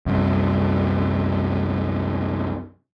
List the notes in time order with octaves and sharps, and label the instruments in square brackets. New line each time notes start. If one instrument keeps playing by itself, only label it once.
[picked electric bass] C2 F#2